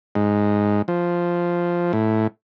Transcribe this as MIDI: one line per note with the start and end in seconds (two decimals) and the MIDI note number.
0.15 0.82 44
0.88 1.92 53
1.93 2.27 45